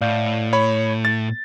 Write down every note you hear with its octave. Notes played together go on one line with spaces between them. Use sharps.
A2 D5 F5 G6
C#5 B5
A6